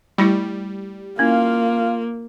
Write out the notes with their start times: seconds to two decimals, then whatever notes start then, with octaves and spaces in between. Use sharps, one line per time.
0.18 G3 A3 E4 G4
1.19 A#3 C#4 E4 F4 F5